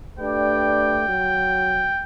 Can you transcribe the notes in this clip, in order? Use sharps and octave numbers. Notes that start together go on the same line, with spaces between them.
A3 D4 G4 B4 D5 G5
F#3